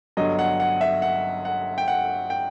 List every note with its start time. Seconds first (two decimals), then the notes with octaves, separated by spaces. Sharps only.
0.17 G1 G2 F#3 D#5
0.39 F#5
0.60 F#5
0.81 E5
1.02 F#5
1.45 F#5
1.78 G5
1.88 F#5
2.30 G5